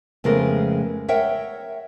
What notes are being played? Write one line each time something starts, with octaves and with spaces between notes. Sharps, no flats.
F2 C#3 G#3 A3 B3 A#4
A#4 C#5 E5 F#5 G5